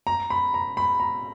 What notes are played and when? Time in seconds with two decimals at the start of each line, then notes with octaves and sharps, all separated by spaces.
0.07 A#5
0.30 B5
0.54 A#5
0.77 B5
1.00 A#5